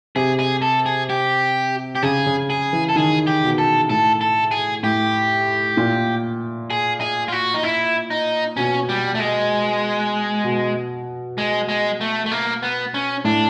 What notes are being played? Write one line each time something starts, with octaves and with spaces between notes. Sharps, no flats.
C3 G#4
G#4
A4
G#4
G4
G4
C#3 G#4
C#3
G#4
E3
A4
D#3 G#4
G4
B2
A4
A2 A4
A4
G#4
A2 G4
A#2
G#4
G#4
F4
F#4
D#4
E4
D#4
B2 C#4
G3
A3
G#3
B2
G#3
G#3
A3
A3
A#3
B3
C#4
A2 D4